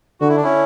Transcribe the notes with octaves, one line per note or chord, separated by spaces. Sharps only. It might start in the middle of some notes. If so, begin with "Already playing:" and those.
D3 F#4
E4
D4
C#4 E4